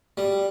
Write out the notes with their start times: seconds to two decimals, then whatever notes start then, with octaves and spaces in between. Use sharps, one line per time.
0.17 G3